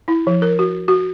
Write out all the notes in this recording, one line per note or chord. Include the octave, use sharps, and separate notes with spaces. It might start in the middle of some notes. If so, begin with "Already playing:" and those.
E4
F3
A#4
F#4
F#4